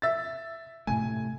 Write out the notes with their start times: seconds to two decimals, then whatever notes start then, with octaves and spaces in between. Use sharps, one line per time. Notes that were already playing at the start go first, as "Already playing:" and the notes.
0.02 E5 A6
0.87 A2 C3 A3 G#5